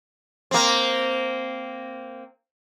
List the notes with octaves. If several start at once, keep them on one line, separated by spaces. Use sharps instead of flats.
A#3 C4